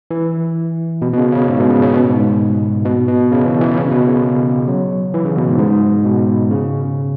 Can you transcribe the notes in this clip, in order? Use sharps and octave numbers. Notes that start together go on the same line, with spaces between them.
E3
B2
B2
C#3
C#3
G#2
B2
C#3
C#3
B2
G#2
B2
B2
C#3
E3
E3
C#3
B2
C#3
F#3
E3
C#3
B2
G#2
G#2
B2
C#3